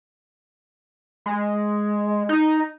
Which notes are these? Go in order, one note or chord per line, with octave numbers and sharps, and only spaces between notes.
G#3
D#4